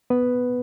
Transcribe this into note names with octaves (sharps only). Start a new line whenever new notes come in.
B3 B4